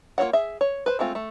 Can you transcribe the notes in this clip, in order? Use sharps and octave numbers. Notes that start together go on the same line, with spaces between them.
A#3 F4 A4 C#5 F#5
G#4 E5
C#5
B4 C5
G#3 A3 C4 F4
A3